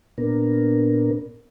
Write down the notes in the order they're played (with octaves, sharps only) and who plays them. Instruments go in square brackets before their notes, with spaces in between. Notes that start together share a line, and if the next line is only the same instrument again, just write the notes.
[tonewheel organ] A#2 B3 D4 A#4